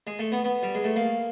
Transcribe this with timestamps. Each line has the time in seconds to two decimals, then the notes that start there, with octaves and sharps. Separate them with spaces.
0.07 G#3
0.19 A3
0.32 B3
0.44 B3
0.63 G3
0.75 G#3
0.84 A3
0.96 A#3